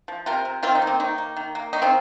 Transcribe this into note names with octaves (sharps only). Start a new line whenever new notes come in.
F3
C3 F4 A#4
C3
D#3 C4 F4
D#4
A#3
C4
D#3 D#4
A#3
D#3
A#3
D#3 D#4
C4 F4